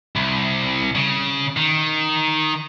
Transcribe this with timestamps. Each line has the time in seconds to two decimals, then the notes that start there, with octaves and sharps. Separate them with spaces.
0.16 C2
0.95 C#3
1.57 D#3